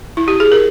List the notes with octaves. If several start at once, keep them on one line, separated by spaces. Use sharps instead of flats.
E4
G4
G#4
A#4